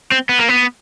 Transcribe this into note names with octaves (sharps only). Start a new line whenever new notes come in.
C4
B3
A#3
B3